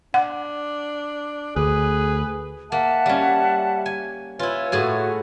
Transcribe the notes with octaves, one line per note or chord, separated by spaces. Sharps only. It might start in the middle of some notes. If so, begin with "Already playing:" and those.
D4 F#5
D2 G#4 B4
A#3 E5 F#5 A5
G3 C#4
G#5
E4 F4 B4 C#5 G#5
A2 F#4 G#4 G#5